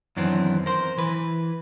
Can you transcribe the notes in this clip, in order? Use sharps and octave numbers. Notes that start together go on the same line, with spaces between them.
F#2 D#3 E3 B3 C4 D4
A#4 C5
E3 B4